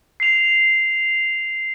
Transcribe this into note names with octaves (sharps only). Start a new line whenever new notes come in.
C7 F7